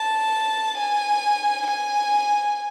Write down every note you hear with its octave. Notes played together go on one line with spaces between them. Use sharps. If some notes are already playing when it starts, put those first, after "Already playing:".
Already playing: A5
G#5
G#5